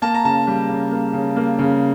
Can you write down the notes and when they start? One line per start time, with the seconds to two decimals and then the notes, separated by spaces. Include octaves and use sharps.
0.02 A#3 A5
0.14 A#5
0.24 C#3 A5
0.47 G3
0.69 C#3
0.91 A#3
1.13 C#3
1.36 A#3
1.59 C#3